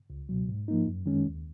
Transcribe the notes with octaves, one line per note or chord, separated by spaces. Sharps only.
C#2
B2 F#3
G#2
F3 A#3 D#4
F#2
D#3 G#3 C#4
D#2